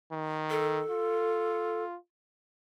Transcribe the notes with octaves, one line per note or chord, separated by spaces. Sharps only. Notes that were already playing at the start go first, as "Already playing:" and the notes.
D#3
A4
F4